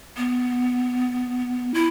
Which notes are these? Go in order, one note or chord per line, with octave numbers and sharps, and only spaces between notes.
B3
E4